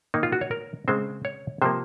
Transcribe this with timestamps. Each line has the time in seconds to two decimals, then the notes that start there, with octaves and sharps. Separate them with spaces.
0.14 D#3 A#3 D#4
0.23 F4
0.32 F#4
0.41 C#5
0.51 A#4
0.88 C#3 G#3 C4 C5
1.25 C#5
1.62 C3 F3 A#3 C5